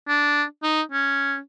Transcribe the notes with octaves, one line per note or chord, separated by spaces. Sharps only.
D4
D#4
C#4